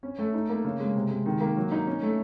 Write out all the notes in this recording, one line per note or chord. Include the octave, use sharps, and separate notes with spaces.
C#4
A3
D#4
A#3
C#3
G#3
C3
G#3
D#3
A#3
F#3
D#4
C#4
A3